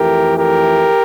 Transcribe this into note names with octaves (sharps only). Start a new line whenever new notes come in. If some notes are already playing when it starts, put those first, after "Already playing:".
Already playing: F2 E3 A3 G4 A#4
G4 A#4